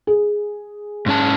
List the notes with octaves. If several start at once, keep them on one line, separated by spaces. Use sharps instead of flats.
G#4
G#2 C#4 A5